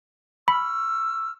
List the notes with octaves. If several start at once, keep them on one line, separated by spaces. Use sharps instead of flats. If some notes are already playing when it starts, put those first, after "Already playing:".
B5 C#6 E6 F6